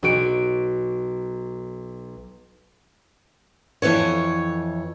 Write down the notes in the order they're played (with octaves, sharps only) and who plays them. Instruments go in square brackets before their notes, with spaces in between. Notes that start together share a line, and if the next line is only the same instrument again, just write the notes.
[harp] B1 F#4 D7
[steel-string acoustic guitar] F2 A#2 E3 C#5